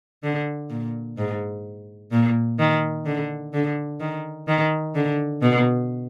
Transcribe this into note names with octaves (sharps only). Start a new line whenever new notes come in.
D3
A#2
G#2
A#2
D#3
D3
D3
D#3
D#3
D3
B2